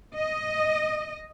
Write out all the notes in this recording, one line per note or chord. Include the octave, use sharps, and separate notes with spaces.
D#5